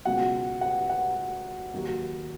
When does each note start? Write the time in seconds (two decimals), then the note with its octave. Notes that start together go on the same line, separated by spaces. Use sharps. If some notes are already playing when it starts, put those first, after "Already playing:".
0.05 C#2 B2 F#3 F#5
0.61 F#5
0.89 F#5
1.73 D#2 D#3 F#3